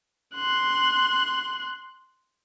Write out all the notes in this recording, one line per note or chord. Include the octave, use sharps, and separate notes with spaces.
C6 F#6